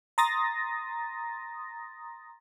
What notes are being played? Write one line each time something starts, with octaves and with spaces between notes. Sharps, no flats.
A#5 C6 D#6 A6 A#6